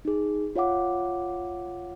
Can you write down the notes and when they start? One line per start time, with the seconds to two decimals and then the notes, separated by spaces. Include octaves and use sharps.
0.05 D#4 G#4
0.55 F4 C#5 F5 F#5 D6